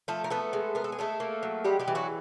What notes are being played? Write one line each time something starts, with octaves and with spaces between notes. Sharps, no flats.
F3 A3 A4
A#4
A3 B3 A4
G#3
B3 A#4
A4
G#4
G#3 A3 A4
A#3
F#3
G3 G#3 G4
G3 G4
E3
F#3 F#4